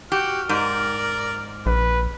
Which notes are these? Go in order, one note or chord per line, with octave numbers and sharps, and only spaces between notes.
F#4 G4 F6
G#2 A#4 D5
A#1 B4